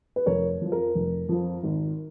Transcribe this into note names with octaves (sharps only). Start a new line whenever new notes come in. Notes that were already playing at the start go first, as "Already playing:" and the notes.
B4
F1 A#4 C#5
F2 F3
A#4
F1
F2 F3
G#1